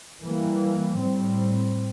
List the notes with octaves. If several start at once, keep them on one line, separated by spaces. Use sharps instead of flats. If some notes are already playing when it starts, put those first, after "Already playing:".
E3 G3 A#3
A2 G3 C4